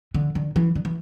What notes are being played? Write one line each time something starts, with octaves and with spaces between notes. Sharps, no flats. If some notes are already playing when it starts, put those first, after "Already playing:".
D3
D3
E3
D3
E3